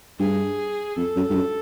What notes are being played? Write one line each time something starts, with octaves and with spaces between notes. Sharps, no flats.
G2 G#4
F2 A4
F#2
G2
F#2